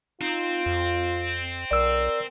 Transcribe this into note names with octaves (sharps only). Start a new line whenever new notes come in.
C4 D#4 F4
F2
B1 A#4 D5 E6